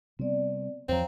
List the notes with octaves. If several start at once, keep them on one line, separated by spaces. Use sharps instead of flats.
C3 G3 B3 C4 D5
E2 F3 C4 C#5 F5 A#5